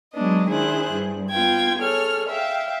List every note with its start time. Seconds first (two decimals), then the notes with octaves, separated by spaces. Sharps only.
0.13 F#3 G#3 B3 D4 D#5
0.49 D#3 D4 E4 G#4 C5 F#6
0.89 G2
1.30 B3 F4 G5 G#6
1.79 G#4 A4 C#5 F6
2.29 E5 F5 G5